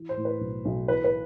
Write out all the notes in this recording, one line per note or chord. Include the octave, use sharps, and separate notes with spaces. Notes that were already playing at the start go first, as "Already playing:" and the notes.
Already playing: E3
C5
A2
B4
B1
B1
E3 B4
B4